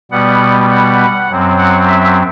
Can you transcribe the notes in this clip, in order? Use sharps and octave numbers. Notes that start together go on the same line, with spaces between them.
B2 G3 B3 F#5
F#5
F#2 F#3 C4
F#5
E5